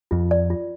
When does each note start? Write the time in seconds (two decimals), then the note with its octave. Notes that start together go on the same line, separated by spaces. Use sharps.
0.11 F2 F4
0.31 D5
0.50 F4